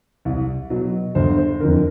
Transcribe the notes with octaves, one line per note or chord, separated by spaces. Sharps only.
C2
B2 F#3
G1 C5
C5
F2 D3 A#4